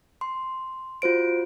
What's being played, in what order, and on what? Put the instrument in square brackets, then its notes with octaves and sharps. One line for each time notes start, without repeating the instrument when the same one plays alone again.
[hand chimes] C6
F4 F#4 C5 D7